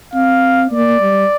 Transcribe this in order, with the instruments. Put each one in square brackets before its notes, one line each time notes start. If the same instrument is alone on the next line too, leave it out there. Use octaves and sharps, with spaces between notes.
[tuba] C4 [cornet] F5
[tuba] A#3 [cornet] D5
[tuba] G3